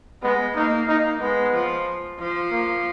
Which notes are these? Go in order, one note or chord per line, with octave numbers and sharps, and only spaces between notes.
G#3 B3
A#3 D#4
A#3 D#4
G#3 B3
F3
F3
A#3